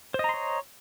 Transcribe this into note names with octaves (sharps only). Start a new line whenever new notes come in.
C5 C#5 D#5 A#5 C6